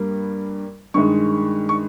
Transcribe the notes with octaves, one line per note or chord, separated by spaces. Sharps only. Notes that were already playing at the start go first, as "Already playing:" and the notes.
Already playing: G2 G3 A#3
G2 D#3 G#3 C#6
C#6